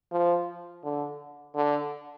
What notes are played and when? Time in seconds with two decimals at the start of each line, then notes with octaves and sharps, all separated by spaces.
0.12 F3
0.84 D3
1.55 D3